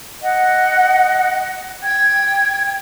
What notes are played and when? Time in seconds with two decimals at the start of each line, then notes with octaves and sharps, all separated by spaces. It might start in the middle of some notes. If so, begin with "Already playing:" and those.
0.22 D#5 F#5
1.83 G5 G#6